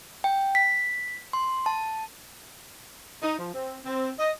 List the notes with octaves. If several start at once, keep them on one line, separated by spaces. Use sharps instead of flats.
G5
B6
C6
A5
D#4
F3
C4
C4
D#5